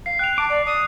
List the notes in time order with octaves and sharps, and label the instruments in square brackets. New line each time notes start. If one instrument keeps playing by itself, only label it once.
[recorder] F5 [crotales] C7
[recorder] G5 [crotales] F#6 F7
[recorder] A5 [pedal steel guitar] D6
[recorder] D5
D#6